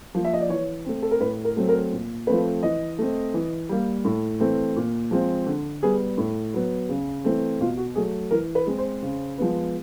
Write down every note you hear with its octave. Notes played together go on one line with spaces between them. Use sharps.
F3 A#3
E5
D#5
D5
E3 C#5
A3 C4
A4
A#4
A2 B4
A#4
F#3 A3 C4
A#4
A#2
F3 A3 C4 B4
E3 D#5
A3 C4
E3
G3 A#3
A2
E3 A3 C4
A#2
F3 G#3 C4
D3
G3 B3 G#4
A2
F#3 B3
C#3
E3 A3 C4
B2 F4
F#4
F#3 A3 G#4
E3 A#4
B4
G#3 C4
C5
C#3
F3 G#3 B3